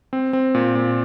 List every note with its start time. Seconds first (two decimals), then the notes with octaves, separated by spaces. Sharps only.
0.13 C4
0.33 C4
0.55 A#2
0.75 A#2